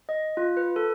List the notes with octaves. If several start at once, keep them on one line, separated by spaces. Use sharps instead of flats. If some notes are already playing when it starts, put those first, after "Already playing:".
D#5
F4
B4
A4